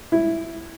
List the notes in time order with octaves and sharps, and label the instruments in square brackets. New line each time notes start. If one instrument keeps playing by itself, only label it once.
[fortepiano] E4